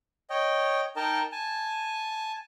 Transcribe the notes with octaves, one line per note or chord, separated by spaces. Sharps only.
C#5 D#5 G5
D#4 A#4 D#5 G5 A5
G#5 A5